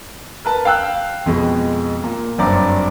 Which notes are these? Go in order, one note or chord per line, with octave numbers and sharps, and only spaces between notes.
A#4 B4 A5
F5 G5 E6 F#6
F2 B2 G#3
A#2
F#1 G2 C4 D5 A#5 D6